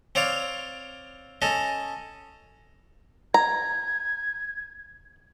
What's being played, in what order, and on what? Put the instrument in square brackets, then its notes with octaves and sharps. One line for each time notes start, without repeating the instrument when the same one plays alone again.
[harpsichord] C4 C#5 D5 F5
C#4 A4 D#5
[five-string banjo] A#5 [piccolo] G#6